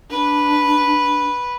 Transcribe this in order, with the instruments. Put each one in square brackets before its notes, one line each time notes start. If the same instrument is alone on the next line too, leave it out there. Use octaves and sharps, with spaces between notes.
[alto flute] D4 [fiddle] B4